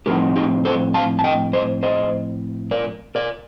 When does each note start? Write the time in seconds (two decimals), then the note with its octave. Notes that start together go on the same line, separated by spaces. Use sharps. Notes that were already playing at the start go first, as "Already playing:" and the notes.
0.06 A2 F3 C4 D#4 G4 A#4
0.36 D#4 G4
0.65 A4 C5
0.94 F5 A5
1.19 A5
1.24 D#5 G5
1.53 C5 D#5
1.83 C5 D#5
2.71 A#4 D5
3.15 A#4 D5